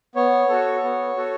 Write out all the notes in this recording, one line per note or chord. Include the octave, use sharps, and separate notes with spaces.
B3 C#5
F#4 A4
B3
F#4 A4